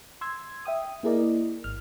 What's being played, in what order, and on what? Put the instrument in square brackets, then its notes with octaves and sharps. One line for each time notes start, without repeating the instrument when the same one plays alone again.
[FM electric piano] C6 E6 G#6
E5 G5 D#6
A#3 E4 G#4 A#4 D5 D#5
G#1 F6